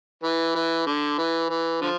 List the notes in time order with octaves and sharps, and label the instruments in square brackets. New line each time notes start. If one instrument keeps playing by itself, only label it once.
[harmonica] E3
E3
D3
E3
E3
D3 F3